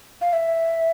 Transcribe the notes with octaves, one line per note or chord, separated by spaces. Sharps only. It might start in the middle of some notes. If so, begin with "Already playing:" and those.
F5
E5